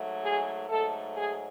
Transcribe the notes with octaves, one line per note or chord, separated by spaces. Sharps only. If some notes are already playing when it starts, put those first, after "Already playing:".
Already playing: G#2 F#3 A3
G#4
G#2 F#3 A3 A4
G#4